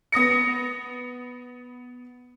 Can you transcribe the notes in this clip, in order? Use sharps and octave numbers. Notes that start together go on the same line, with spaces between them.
B3 D#6 A#6 C#7